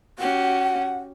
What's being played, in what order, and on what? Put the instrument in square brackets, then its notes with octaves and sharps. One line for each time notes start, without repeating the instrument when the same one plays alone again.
[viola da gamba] C#4 F#4 G4 [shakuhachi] F#5